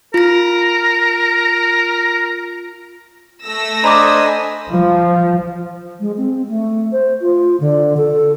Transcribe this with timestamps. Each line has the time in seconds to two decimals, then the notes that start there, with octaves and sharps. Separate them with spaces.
0.14 F4 A#4 A#6
3.43 A3 E6 A#6
3.84 D4 C5 D#5 G#5 A#5 B5 D6 D#6
4.69 F3
6.00 G#3
6.17 C4
6.49 A3
6.92 C5
7.21 F4
7.60 D3
7.97 A4